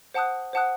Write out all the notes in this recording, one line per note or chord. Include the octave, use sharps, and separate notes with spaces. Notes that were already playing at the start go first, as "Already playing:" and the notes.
C5 F#5 A5 D#6 F#6
C5 F#5 A5 D#6 F#6